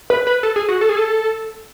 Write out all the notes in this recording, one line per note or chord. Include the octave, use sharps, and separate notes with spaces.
B4
B4
A4
G#4
F#4
A4
G#4
A4